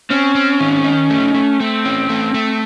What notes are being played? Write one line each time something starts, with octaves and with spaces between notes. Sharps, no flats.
C4 C#4
C4
D#3
D#4
A3
A3
A3 C4
C#4
A3
A3